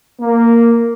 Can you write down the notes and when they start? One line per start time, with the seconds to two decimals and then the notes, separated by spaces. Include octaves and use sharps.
0.21 A#3